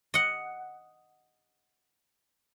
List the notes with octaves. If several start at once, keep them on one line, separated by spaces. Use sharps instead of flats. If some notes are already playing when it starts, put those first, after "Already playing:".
D#5 F#5